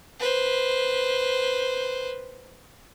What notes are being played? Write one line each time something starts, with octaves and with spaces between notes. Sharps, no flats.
B4 C5